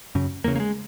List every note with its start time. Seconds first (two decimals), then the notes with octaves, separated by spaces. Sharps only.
0.15 F#2 C#3
0.44 E2 C#3 A#3
0.56 A#3
0.60 G#3